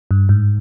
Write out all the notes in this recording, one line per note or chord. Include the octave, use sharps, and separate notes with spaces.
G2
G#2